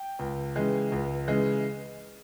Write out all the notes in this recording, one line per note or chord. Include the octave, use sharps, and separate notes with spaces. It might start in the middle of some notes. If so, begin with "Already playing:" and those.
Already playing: G5
C#2
C#3 E3 G#3
C#2
C#3 E3 G#3